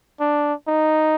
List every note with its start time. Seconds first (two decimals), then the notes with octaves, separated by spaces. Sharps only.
0.21 D4
0.68 D#4